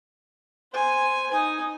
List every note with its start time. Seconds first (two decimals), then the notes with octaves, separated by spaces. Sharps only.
0.72 C5 G#5
1.30 D#4 G#5